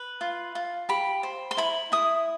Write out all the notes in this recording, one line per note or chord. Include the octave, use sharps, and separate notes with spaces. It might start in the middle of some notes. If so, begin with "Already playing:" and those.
Already playing: B4
F4
F4
G4 B5
C5
C6
E4 B5
E4 D#6